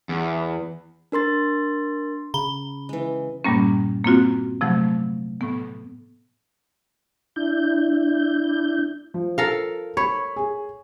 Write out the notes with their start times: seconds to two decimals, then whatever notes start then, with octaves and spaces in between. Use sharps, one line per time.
0.09 E2
1.12 D4 A#4 C6 A6
2.34 C#3 A#5 B5 G7
2.89 E3 G#3
3.45 G2 A#2 G3 A#3 C#4
4.05 A#3 C4 F4 F#4
4.61 C3 F3 F#3 A3
5.41 A2 B3
7.36 D4 E4 G6
9.14 F3
9.38 A4 A#4 F5
9.97 C#5 B5
10.36 G#4